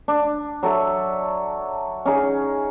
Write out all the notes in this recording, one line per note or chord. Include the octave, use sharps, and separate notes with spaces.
D4
F#3 A4 E5
C#4 D#4 G#4